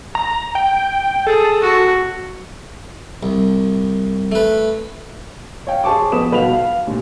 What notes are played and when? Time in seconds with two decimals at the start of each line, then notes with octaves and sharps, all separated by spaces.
0.15 A#5
0.55 G5
1.27 G#4 A4
1.61 F#4
3.23 C2
4.32 A3 B4
5.67 C#5 F5 G5
5.84 G#4 C5 A5 C#6 D6
6.12 F3 B3 B4 D#6 E7
6.32 B1 B4 F5 F#5 F7
6.53 F5
6.87 D#2 A#2